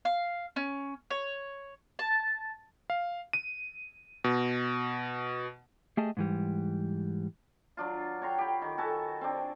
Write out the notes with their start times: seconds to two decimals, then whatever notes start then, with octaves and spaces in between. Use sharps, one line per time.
0.05 F5
0.56 C#4
1.11 C#5
1.99 A5
2.90 F5
3.33 D#7
4.24 B2
5.97 A3 G4 G#4 D#5 A5
6.17 G#2 E3 G3
7.77 F#3 D4 F4
8.22 C#5 G5 A#5 C6
8.38 G4 B5
8.62 D#3
8.78 F#4 A4 G#5 A5
9.21 C4 D4